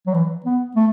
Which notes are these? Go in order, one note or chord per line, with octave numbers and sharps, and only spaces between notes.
F#3
E3
B3
A3